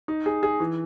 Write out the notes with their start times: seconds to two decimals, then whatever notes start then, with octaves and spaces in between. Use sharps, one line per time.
0.08 D#4
0.26 G#4
0.43 G#4
0.60 E3